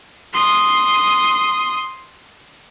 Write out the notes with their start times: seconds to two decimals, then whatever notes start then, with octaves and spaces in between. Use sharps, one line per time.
0.33 C6 D#6